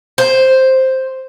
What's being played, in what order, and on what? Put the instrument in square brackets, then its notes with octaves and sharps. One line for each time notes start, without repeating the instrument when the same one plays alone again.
[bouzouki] C5